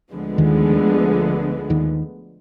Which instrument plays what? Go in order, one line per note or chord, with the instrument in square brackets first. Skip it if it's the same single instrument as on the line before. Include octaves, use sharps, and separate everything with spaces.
[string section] D2 D3 F3 G#3 B3
[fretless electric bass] D#2 D#3
D#2 D#3